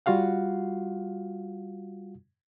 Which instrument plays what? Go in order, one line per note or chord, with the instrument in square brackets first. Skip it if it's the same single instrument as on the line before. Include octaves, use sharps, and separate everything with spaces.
[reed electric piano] G3 F4 F#4 F5 F#5